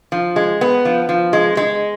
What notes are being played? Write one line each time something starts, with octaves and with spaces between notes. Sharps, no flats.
F3
G#3
B3
F3
F3
G#3
G#3